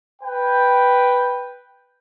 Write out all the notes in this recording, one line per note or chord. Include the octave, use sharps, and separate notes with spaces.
B4 G5